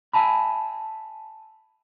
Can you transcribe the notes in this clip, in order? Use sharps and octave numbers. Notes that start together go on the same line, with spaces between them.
E5 G#5 A5 B5